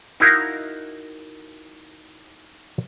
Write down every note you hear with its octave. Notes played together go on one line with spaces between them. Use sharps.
D#4 E4 F#4 A#4 D#5 F5